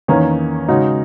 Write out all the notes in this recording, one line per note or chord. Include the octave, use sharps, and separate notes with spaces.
E2 D#3 A#3 C#4
C#3 G#3 D#4 F#4